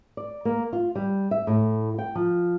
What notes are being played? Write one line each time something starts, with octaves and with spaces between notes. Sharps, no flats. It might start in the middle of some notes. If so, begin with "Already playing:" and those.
D5
A#3
F4
G3
E5
A2
G5
F3